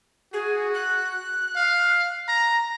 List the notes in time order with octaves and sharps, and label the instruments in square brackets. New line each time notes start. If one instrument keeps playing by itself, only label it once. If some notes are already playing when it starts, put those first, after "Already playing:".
[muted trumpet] F#4 [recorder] G#4
[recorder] F#6
[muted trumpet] F5
A#5